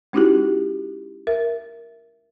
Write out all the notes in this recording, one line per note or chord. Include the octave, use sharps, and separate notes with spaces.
G#3 C#4 D#4 E4 F#4 G4
A#4 E5